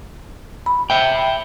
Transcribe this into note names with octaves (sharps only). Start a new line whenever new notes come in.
B5
E5 G5